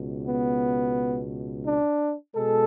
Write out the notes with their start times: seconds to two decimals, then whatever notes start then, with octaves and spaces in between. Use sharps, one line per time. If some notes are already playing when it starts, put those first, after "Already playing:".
Already playing: C#2 B2
0.27 B3
1.65 D4
2.34 B2 G#3 A4